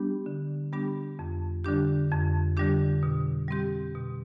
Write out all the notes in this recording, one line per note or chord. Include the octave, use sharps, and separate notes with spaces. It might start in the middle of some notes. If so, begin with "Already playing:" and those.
Already playing: G3 B3 D4 G4
D3
G3 B3 D4 G4
F2
D3 G3 D4 G4
F2
D3 G3 D4 G4
B2
G3 C4 G4
B2